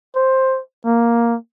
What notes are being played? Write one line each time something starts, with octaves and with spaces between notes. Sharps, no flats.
C5
A#3